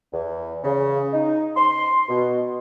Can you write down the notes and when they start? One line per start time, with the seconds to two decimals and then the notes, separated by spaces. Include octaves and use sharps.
0.12 E2
0.64 C#3
1.13 D#4
1.57 C6
2.09 B2